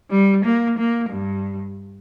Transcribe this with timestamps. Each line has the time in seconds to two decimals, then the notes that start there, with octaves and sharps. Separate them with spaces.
0.11 G3
0.44 A#3
0.78 A#3
1.10 G2